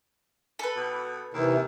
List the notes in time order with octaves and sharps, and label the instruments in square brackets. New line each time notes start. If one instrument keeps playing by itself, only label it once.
[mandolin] A4 B4
[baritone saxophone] B2
[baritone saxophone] D#2 [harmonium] C3 E3